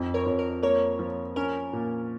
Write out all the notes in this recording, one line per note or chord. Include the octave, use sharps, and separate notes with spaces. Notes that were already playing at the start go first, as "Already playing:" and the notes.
Already playing: F2 D#4
A#4 C#5
F2
A#4
A#3 A#4 C#5
F3
C#4 A#4
A#2